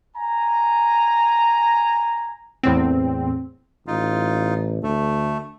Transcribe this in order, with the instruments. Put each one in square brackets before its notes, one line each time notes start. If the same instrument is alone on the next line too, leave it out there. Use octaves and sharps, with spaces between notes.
[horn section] G#5 A#5
[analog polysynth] E2 A2 C4
[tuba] A1 [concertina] D#4 F4
[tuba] D2 [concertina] A3